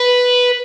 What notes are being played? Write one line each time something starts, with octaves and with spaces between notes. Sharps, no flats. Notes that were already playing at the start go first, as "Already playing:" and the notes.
Already playing: B4